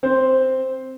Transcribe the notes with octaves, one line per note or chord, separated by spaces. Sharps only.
C4 C5